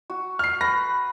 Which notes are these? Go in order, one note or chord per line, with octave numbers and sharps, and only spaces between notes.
F#4
F6 C7
B4 A#6